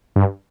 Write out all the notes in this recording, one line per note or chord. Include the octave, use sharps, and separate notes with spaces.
G2